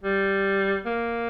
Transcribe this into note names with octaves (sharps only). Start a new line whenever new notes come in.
G3
A#3